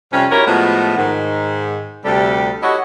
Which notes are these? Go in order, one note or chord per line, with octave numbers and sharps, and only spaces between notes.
F2 C3 G3 C#4
D#4 E4 F#4 G4 A#4 C#5
A2 F3 G#3 A3 B3 F#4
G#2 D#3 G#3
D2 C3 G3 G4 A4
E4 F#4 G4 A4 C#5 D#5